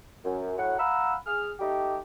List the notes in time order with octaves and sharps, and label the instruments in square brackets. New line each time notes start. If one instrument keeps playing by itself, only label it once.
[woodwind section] F#2
A2 F#3 F#5
F5 F#5 A#5 B5 E6
G#4 F6
A3 D#4 G4